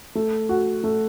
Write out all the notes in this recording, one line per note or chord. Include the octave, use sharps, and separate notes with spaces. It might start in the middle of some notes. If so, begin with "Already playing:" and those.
A3
F#4
A3